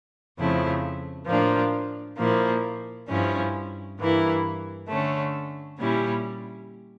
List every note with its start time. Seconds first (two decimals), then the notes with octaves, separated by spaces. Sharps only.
0.37 F2 C#3 F3 A3 E4
1.26 A2 F3 A#3 D4
2.17 A#2 F3 A#3 E4
3.08 G2 F3 C#4 E4
3.98 G2 E3 A#3 E4
4.88 D3 A3 C#4
5.78 A#2 G3 C#4 E4